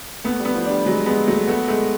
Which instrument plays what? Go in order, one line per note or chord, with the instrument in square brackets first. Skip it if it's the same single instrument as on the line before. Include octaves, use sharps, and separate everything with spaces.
[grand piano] A3 [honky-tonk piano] B3
[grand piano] G3
[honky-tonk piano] B3
[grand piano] F3
[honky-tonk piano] D4
[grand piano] G3
[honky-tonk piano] F#3 [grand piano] G#3
[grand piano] G#3 [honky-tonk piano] B3
[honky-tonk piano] F#3 [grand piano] A3
[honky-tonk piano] A3 [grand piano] B3
[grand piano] G#3 [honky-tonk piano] A3